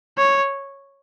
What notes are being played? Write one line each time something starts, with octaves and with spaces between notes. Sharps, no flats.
C#5